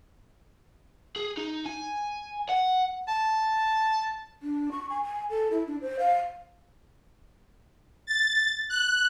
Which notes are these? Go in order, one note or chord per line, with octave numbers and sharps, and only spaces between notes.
G#4
D#4
G#5
F#5
A5
D4
C#6
G#5
G#5
A4
E4
D4
C5
F5
A6
F#6